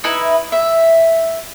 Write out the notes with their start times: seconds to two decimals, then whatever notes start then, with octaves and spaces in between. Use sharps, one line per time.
0.04 D#4 E4 B4
0.52 E5